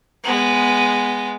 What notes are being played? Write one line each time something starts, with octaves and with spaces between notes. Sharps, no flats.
G#3 B3